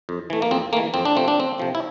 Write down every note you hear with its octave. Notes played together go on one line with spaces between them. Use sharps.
F2
E3 A3
A#3
F2 C4
E3 A3 A#3
F2 C4
D4
C3 F3 A3 C4
D4
F2 C4
C3 F3 A3
E4